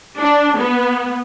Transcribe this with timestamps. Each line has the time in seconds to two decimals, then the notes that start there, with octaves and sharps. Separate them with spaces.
0.21 D4
0.59 B3